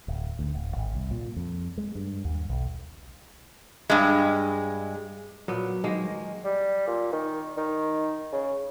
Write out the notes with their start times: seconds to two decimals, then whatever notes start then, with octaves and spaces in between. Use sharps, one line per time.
0.08 D1
0.39 D2
0.54 D1
0.76 G#1
0.95 C2
1.11 A#2
1.36 F2
1.78 G#3
1.95 G2
2.25 D#2
2.50 B1
3.90 G2 G#3
5.48 A#2 F#3 B3
5.84 D#3 G#3 A#3
6.44 G3
6.87 A#2
7.13 D#3
7.57 D#3
8.32 C#3